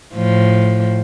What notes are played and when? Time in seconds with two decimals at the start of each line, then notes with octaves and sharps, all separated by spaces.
0.14 A2 F3